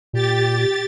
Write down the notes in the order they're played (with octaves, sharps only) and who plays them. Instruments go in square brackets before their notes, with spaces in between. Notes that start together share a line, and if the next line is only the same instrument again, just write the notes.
[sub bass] A#2 [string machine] G4 A6